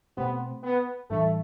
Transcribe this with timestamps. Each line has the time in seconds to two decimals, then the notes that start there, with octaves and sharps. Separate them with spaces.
0.17 B2 A3 B3 C4 G4 C5
0.64 B3
1.10 A2 E3 G3 A3 D4